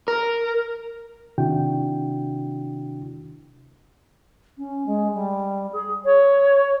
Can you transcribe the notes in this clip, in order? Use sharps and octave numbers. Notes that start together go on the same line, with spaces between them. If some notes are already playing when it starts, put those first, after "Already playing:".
A#4
C3 D#3 D4 E4 F#4 G5
C#4
G#3
G3
G#4
C#5